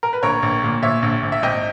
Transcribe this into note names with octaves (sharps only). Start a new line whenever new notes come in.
A#4
B4
A#1 A#4 C#5
A#1
A#2
A#2 C#5 E5
A#1
A#1
E5
G#1 D#5 G5